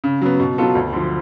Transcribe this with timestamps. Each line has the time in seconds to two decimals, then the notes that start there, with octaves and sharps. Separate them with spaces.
0.04 C#3
0.21 F#3 B3
0.40 B2
0.58 F#3 B3 F4 A4
0.75 D2
0.93 D3 F3